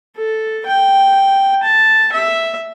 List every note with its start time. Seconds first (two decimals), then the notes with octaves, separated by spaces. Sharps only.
0.16 A4
0.66 G5
1.63 A5
2.12 E5